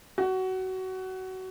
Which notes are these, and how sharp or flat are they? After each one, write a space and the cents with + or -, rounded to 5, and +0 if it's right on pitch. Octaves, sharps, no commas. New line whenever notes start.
F#4 +20